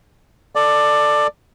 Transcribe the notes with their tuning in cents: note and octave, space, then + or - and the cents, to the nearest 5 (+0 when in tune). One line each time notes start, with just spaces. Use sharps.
A4 +5 D5 +15